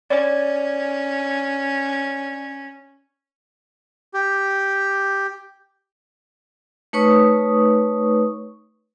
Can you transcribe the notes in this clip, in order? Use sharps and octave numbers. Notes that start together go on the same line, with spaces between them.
C#4 C#5 D5
G4
A3 D#4 B4 C#5 C#6 D#6